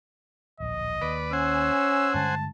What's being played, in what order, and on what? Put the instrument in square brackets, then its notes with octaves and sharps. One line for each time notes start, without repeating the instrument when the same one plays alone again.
[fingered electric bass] D1 A#1 [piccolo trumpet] D#5
[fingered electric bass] D#2 [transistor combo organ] B4 D5
[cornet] C#4 [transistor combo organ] C5 F#5 G#5 [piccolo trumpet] E6
[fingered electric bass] G2 D3 G#3 [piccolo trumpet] A5